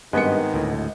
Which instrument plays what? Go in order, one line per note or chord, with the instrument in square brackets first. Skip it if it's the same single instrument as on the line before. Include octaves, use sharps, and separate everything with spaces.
[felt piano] G#1 D#5 C#7 [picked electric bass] G2 [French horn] D#3 [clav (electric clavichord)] G#3 B3 B4
[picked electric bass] D2 A2